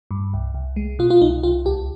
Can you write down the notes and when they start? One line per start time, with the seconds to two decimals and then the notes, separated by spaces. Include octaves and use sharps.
0.11 G2
0.33 C2
0.54 C2
0.76 G#3
0.99 B2 F4
1.10 F4
1.21 C2 D#4
1.43 C2 F4
1.65 D2 G4